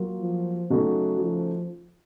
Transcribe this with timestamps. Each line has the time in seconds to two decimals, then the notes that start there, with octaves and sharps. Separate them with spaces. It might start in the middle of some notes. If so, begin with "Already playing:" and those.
Already playing: F#3 A#3 F4
0.21 F3
0.70 C#3 F#3 A3 D#4 F#4
1.20 F3